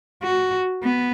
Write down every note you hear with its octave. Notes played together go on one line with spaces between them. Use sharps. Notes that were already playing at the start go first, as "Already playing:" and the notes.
F#4
B3